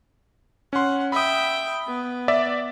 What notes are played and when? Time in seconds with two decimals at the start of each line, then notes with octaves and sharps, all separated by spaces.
0.73 C#4 F#5 C6
1.12 E5 G5 B5 D#6
1.87 B3
2.28 D5 E5